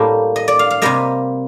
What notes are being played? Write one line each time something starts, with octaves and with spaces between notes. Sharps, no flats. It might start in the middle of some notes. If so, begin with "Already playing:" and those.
Already playing: A2 G3 A#3
D#5
D5
F5
F5
C3 G3 A#3 D#5